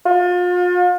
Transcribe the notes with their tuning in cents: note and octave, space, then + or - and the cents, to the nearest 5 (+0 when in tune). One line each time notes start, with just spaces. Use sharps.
F4 +35